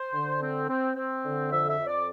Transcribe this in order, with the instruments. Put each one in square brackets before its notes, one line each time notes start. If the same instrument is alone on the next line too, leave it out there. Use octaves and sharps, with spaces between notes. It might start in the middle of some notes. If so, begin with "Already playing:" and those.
Already playing: [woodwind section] C5
D3
C4
C4
C4
D3
F2 E5
E5
F2
D5